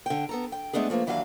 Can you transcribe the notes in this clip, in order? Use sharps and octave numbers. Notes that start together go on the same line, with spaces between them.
D3 G5
B3 A4 A#5
G5
G#3 A3 B3 D4 G#4
F3 A3 A#3 B4
D#2 E3 F#3 D4 E5 F5